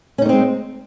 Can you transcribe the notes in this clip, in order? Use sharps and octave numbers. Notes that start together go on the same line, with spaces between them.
G#3 A#3 C4 C#4 D#4